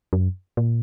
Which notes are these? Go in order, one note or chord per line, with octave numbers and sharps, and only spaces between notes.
F#2
A#2